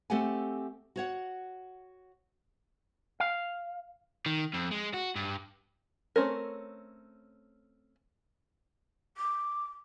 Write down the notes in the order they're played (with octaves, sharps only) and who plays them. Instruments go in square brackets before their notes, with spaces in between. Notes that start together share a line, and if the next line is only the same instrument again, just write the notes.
[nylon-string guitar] A3 C4 G4 A4 F#5 G#5
F#4 C#5 F#5
[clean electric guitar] F5
[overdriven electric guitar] D#3
F2
G#3
F#4
G2
[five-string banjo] A3 C4 C#4 A#4
[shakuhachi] D6